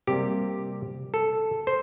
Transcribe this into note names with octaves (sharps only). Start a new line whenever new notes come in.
C3 G3 A#3 G4
A4
C5